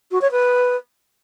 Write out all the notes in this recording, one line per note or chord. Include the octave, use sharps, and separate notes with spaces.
F#4
C#5
B4